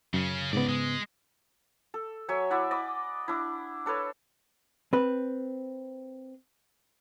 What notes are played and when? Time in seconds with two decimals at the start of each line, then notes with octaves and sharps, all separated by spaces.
0.14 F#2 C#3 C#4
0.53 C2 G#2 C#3 B3 D5
0.69 G#3
1.94 A4
2.29 F#3 C#5 E5 G#5
2.50 E4 D5 E5 F#5
2.71 D5 D#5 B5 D6
3.28 D4 E4
3.86 D4 A4 B4 C#5
4.93 C4 B4